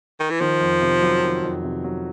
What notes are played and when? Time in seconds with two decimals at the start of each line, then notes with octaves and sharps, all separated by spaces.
0.20 D#3
0.30 E3
0.40 D#3 F3
0.61 F2
0.82 C3
1.02 F#3
1.23 D#3
1.43 F2
1.64 C3
1.84 F#3